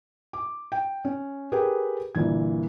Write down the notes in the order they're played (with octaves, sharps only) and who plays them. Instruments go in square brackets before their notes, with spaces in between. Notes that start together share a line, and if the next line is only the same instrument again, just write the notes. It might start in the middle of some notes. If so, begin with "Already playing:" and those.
[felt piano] D6
G5
C#4
G4 G#4 A#4 B4 G5
G1 A#2 E3 G#6